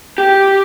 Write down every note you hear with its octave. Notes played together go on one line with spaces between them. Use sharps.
G4